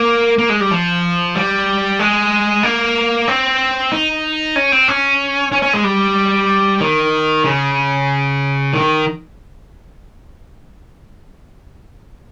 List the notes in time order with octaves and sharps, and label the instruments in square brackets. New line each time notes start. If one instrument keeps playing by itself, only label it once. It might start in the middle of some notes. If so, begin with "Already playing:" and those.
Already playing: [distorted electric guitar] A#3
A#3
G#3
G3
F3
G3
G#3
A#3
C4
D#4
C#4
C4
C#4
C#4
C#4
G#3
G3
D#3
C#3
D#3